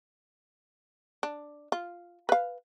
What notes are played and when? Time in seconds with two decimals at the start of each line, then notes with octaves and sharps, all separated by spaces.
1.23 D4
1.72 F4
2.29 B4 F5